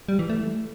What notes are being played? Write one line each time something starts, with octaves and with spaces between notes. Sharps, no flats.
G3
E3
A3